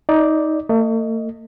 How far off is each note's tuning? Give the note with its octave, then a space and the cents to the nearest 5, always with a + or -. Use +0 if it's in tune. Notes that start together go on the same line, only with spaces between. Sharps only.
D#4 +20 D5 +0
A3 +45 D#5 +0